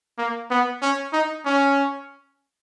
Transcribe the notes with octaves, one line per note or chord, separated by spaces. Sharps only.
A#3
B3
C#4
D#4
C#4